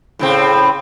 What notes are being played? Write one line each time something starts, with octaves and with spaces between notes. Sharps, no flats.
A2 C#3 C4